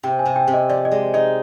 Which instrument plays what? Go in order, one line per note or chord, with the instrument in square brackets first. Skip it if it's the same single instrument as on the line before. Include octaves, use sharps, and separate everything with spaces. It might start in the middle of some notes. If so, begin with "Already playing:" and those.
[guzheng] C3 [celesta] G5
[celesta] G#5
[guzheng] C3
[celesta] G5
[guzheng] C3
[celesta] D#5
[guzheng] F3 [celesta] D5
[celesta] D#5
[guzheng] G#3 [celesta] D5
[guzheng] D#4 [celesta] D#5